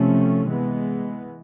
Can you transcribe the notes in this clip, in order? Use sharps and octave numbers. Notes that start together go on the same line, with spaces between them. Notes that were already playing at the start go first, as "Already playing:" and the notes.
Already playing: C3 F3 A3 C#4
E3 G#3 B3